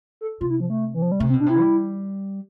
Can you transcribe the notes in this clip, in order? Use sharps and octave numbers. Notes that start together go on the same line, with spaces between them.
A4
C3 F4
E4
F3
A3
E3
F3
G3
C3 A3
C4
B2
D4
C3 E4
G3